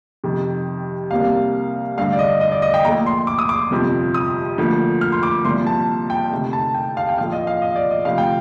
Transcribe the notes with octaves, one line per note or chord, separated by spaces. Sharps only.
F2 C3 D#3
C2 C3 G3 A#3 F5
G2 D3 A3 F5
D5
D#5
D#5
D5
D#5
G5
A#1 A#2 A3 A#5
C6
D6
D#6
D6
G1 F2 C3 F3
D#6
D2 D3 F3 A#3
F6
C6
D6
C2 A#2 F3 C6
A5
G5
D2 C3 D#3
A5
G5
F5
G5
A#1 A2 F3 A3 F5
D#5
F5
D#5
D5
D#5
D2 C3 F3 F5
G5